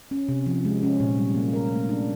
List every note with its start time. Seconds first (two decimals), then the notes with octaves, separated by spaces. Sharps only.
0.11 C#4
0.29 C3
0.46 F3
0.65 G#3
0.83 C#4
1.00 A#2
1.17 G3
1.35 A#3
1.53 A#4
1.71 A3
1.89 D4